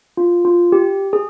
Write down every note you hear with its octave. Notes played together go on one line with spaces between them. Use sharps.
F4
F4
G4
G#4